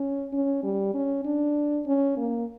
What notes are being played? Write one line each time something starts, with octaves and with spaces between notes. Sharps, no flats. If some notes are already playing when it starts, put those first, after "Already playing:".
Already playing: C#4
C#4
G3
C#4
D4
C#4
A#3